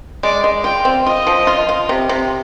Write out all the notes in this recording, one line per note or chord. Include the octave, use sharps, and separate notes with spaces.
G#3 D5
G#3
F4 G5
C4
F4 D#5
F3
F4
F4
C3
C3